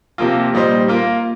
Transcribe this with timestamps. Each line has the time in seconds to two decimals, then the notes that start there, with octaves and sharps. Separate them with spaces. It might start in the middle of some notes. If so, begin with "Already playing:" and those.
0.18 C3 F3 A#3 F4
0.54 A#2 G3 D#4 C5
0.88 A#3 F4 A#4